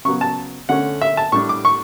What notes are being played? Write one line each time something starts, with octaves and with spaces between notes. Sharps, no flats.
C#3 F#3 B3 C#6
A5
D3 A3 C#4 F#5
E5
A5
A2 G3 D4 C#6
D6
C#6